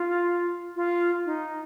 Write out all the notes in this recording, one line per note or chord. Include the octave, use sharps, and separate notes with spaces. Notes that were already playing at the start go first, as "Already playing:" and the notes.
Already playing: F4
F4
D#4